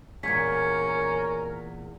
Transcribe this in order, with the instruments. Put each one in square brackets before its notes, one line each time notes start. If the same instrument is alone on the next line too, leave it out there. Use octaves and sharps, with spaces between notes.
[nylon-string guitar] E2 A#2 [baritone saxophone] C#4 [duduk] A#4 [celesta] G#6 B6